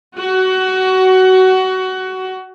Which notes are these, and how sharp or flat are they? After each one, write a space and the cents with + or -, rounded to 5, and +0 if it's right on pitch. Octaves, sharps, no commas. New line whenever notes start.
F#4 +20